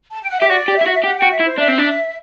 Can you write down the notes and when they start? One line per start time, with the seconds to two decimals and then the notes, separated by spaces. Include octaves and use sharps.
0.12 A5
0.22 G5
0.31 F#5
0.40 G4 E5
0.50 F#4 D5
0.68 G4
0.77 E4 E5
0.87 F#4
0.92 E5
1.04 G4 F#5
1.18 F#4 G5
1.31 E5
1.40 E4
1.44 C5
1.58 D4 E5
1.68 C4
1.78 D4